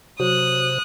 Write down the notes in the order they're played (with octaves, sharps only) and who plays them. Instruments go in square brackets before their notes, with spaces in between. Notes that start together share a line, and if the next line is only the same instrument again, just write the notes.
[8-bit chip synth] C3 C5 [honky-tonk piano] F#3 [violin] D#6 F#6